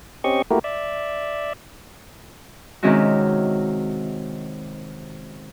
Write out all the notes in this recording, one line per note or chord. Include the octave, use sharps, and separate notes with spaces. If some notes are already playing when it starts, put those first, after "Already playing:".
C4 C#4 G4 D#5 C#6
A3 A#3 E4 F#4 G4 A#4
D5 E5
C3 D#3 G#3 C#4 E4 F#4